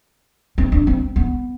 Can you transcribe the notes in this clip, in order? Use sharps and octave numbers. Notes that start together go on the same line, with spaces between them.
C4
D4
C4
B3